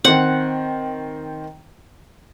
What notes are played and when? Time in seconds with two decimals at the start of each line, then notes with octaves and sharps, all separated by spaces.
0.04 D#3 C4 F#5